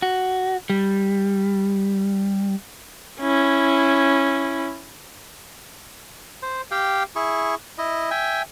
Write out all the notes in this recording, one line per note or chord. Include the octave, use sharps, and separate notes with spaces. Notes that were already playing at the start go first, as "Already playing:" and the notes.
F#4
G3
C#4 E4
C5
G4 F5 G5
E4 G#4 C#6
E4 D#5
E5 G5 G#5